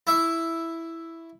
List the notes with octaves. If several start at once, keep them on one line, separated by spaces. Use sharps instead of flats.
E4 E5 C#6